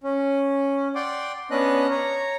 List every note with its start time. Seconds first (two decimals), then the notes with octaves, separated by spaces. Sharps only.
0.04 C#4
0.95 D5 F#5 G5 C6 D6
1.51 B3 C#4 D4 B4 D#5 F#6
1.90 C#5 A#5